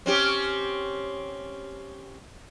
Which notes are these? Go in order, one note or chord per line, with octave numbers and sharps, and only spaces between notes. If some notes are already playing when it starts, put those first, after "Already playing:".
C4 C#4 G4